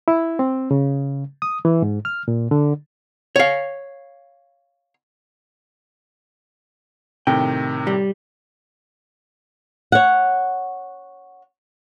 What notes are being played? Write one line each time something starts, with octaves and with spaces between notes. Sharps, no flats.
E4
C4
C#3
D#6
E3
G#2
F6
A#2
D3
C#5 F5
A2 C3 D#3 G5
G3
C#5 F#5